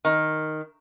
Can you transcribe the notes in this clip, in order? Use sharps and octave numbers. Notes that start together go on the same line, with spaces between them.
D#3